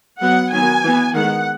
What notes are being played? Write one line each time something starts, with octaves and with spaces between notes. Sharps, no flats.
F#3 B3 F#5
D#3 F#3 B3 G#5
E3 B3
D#3 G#3 B3 F#5